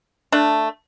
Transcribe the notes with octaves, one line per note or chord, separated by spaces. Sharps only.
A3 D4